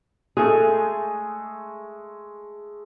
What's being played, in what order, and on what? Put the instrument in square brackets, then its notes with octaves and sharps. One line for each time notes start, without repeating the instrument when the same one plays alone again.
[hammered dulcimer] G#3 A3 [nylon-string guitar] G#4